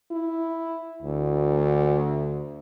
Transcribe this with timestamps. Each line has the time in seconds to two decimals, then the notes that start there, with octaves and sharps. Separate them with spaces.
0.11 E4
1.02 D2